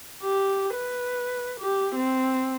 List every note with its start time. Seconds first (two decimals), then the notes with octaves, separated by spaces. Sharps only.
0.22 G4
0.74 B4
1.60 G4
1.96 C4